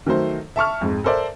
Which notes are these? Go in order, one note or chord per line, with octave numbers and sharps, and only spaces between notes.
D#3 F#3 A3 C5
E5 A5 C#6 F6
F2 G#2
A4 A#4 C5 D5 E5